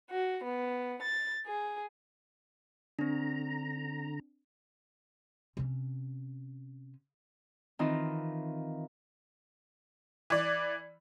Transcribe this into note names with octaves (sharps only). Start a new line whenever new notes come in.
F#4
B3
A6
G#4
D3 C4 D4 A#5
C3 C#4
D#3 E3 C4 D#4 F4
E3 D5